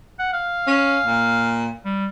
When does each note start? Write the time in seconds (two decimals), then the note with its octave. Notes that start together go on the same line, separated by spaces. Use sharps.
0.19 F#5
0.33 F5
0.67 C#4
1.05 A#2
1.85 G3